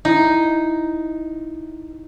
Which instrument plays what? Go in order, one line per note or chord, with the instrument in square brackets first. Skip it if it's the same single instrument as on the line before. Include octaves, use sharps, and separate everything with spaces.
[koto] D#4 [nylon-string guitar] E4